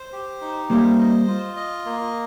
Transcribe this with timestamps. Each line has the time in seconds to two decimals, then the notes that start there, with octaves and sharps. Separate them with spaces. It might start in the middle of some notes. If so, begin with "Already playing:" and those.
Already playing: C5
0.13 G4
0.41 D#4
0.70 G3 A#3 C5
0.99 D#5
1.28 F4
1.57 D#5
1.86 A#3